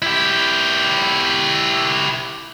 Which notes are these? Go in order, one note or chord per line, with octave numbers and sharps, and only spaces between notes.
E4 G4